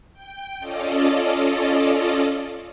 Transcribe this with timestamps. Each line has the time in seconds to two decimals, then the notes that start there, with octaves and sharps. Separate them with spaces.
0.13 G5
0.59 C#4 F4 A4 D5 D#5